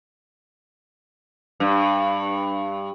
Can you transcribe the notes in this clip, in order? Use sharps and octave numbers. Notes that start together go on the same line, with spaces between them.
G2